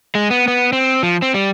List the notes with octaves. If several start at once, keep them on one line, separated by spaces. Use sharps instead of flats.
G#3
B3
B3
C4
F3
C4
G3